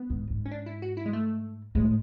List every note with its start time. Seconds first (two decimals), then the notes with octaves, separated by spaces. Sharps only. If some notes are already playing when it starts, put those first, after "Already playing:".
Already playing: B3
0.10 G#2
0.30 G#2
0.46 C#4
0.51 D4
0.66 E4
0.82 F#4
0.97 E4
1.06 G#3
1.13 A3
1.75 A2 G#3